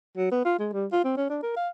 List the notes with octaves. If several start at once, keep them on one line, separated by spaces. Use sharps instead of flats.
F#3
B3
F4
G#3
G3
F4
C4
C#4
D4
A#4
F5